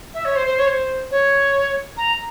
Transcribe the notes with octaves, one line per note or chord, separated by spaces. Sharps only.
E5
C#5
C5
C5
C#5
C5
C#5
A#5